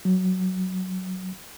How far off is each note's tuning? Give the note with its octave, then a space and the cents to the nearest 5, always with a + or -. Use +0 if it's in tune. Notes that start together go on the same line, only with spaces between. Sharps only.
F#3 +5